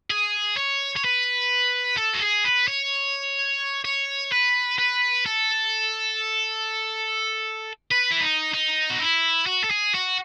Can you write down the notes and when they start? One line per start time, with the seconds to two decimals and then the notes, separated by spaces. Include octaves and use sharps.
0.11 G#4
0.57 C#5
0.96 C#5
1.05 B4
1.98 A4
2.14 F#4
2.22 G#4
2.45 B4
2.68 C#5
3.85 C#5
4.32 B4
4.79 B4
5.26 A4
7.91 B4
8.11 E4
8.22 D#4
8.54 D#4
8.90 F#4
9.00 E4
9.47 F#4
9.64 A4
9.71 G#4
9.94 F#4